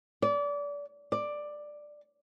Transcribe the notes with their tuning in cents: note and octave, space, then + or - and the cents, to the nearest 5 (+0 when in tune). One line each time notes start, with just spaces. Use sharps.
D5 -30
D5 +10